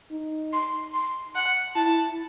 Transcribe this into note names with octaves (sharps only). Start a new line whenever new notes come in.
D#4
C6
C6
F#5
E4 A5